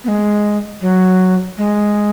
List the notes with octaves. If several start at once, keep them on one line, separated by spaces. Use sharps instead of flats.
B3
G#3
F#3
G#3